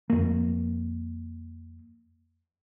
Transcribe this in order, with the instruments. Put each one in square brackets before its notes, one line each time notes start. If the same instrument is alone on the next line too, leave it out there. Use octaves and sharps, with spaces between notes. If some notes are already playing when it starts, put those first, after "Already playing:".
[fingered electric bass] F2 A#3